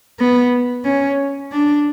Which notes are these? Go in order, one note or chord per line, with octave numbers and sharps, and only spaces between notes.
B3
C#4
D4